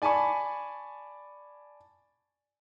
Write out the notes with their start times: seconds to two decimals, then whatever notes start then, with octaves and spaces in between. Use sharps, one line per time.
0.02 D5 G#5 A5 B5 C#6